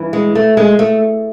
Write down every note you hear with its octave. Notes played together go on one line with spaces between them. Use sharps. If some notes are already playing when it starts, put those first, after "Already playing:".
Already playing: G2 E3
G#3
A3
G#3
A3